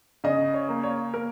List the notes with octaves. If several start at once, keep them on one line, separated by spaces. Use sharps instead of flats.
C#3 D#5
C#5
A#3
C#5
A#3 A#4